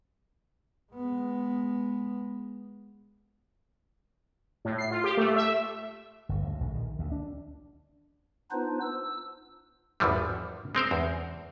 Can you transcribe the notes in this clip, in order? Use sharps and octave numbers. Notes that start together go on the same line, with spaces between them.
G#3 B3
A2
C7
F4
G4
A3
E5
G1
D2
A#1
D#3
D2
D4
B3 D4 D#4 F4 B4 C5
E6
G#1 E2 E3 F3 G3
G#3 C4 A#4 C5
E2